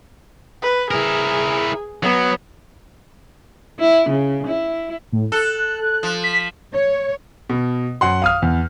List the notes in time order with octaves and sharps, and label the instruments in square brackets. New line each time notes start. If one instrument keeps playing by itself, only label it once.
[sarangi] B4
[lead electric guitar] E4 A#4 [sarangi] G#4
[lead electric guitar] F#3 [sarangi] B3
[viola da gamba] E4
C#3
E4
[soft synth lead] A2
[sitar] A4 [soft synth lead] F#6
[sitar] F3
[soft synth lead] B6
[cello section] C#5
[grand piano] B2
F#2 F#5 C6
F5 D#6 F6
E2